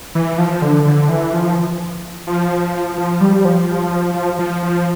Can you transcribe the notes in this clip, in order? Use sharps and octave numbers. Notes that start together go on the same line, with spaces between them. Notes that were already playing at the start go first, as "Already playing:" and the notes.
E3
F3
D3
D3
E3
F3
F3
F3
G3
F3
F3
F3